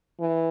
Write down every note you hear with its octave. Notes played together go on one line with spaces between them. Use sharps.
E3